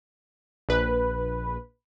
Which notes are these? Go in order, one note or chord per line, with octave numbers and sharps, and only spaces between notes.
A#1 B4